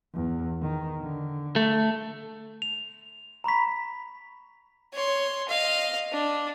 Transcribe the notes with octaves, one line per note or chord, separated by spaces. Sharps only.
E2
D#3
D3
A3
F7
A#5 B5 C#6 B6
C#5 C6
D#5 F5
D4